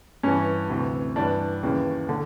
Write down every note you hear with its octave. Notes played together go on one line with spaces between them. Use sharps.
G2 E3 C#4
D2 C3 E3
G2 E3 D4
D#2 C#3 E3
D3